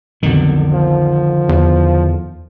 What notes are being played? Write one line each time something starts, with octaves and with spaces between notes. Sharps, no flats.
B1 F2 B2 D3 D#3
F3
E2